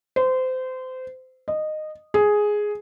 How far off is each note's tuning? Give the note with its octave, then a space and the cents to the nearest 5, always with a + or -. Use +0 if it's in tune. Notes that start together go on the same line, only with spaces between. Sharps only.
C5 -25
D#5 -15
G#4 +5